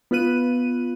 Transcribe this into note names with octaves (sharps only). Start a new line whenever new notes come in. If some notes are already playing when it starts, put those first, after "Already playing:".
B3 F4 B4 F#6 D#7